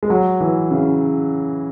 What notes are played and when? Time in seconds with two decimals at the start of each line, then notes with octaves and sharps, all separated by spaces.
0.03 G#3
0.10 F#3
0.41 E3
0.71 C#3